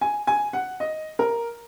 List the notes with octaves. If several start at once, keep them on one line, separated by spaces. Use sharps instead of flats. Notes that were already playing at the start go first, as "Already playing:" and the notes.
G#5
G#5
F#5
D#5
A#4